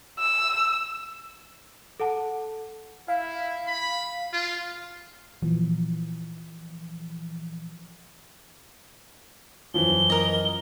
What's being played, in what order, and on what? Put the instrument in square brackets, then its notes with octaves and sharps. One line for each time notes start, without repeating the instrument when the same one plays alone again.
[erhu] E6
[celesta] A4 F#5 A5
[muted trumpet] E4 [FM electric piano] F5
[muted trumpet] B5
F4
[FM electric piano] A#2 E3 F3
[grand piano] F#2 E3 F3 [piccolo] G7
[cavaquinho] A#4 D#5